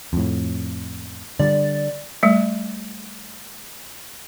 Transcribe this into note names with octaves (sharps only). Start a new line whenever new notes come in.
F2 A2
D3 G3 D5
G3 A3